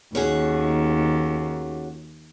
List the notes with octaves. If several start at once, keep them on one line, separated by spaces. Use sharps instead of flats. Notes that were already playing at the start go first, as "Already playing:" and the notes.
D#2 C#4 F#4 G#4